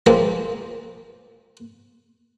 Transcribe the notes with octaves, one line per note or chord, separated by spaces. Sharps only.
E3 F3 G#3 A#3 C4 F4